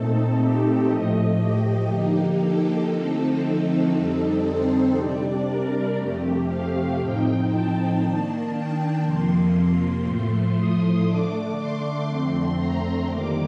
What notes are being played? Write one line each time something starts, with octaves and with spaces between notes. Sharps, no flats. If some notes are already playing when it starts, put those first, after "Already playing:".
Already playing: A#2 A3 C4 D#4 A4
G4
A2 F3 A3 D#5
G4
D3 F3 A#3 D#4
A4
D3 F3 A3 C4 D#4
F2 D3 G3 C4 D#4
C5
C3 G3 D4 D5
A#4
F2 C3 F3 A3 G4
F5
A2 F3 C4 D#4 G5
A5
D#3 A#3 D4 A5
G5
F2 C3 F3 A#3 C6
A2 F3 A3
D#6
D3 A3 D4 D6
C6
F2 D3 A3 C4 C6
A#5
F2 D#3 G3 A#3 D6